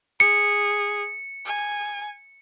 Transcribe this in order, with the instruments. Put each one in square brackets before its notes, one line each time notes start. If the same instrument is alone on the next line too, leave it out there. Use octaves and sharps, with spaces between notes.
[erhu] G#4 [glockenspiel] C#7
[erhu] G#5